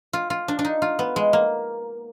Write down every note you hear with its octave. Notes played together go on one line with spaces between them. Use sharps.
F4
F4
D4
D4
D#4
F4
B3
G#3
A#3